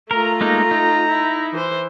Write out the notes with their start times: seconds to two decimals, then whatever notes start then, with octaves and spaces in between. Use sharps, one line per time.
0.11 A3 F4 A#4 A#5
0.41 G#3 A#3 D#4
0.71 D#4
1.07 E4
1.53 E3 C5